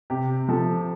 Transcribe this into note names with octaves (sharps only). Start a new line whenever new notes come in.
C3 G4
F3 A4